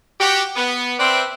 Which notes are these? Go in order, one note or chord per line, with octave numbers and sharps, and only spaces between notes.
F#4 G4
B3
C4 B4 C5 D5 E5 G5